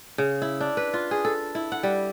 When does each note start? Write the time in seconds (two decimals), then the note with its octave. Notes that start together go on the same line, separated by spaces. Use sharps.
0.18 C#3
0.42 E4
0.60 D4
0.77 B4
0.94 F4
1.11 G#4
1.25 A4
1.55 E4
1.72 F#5
1.83 G3